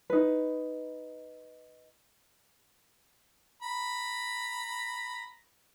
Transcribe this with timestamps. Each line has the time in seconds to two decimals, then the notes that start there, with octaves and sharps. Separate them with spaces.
0.10 D#4 B4
3.62 A#5 B5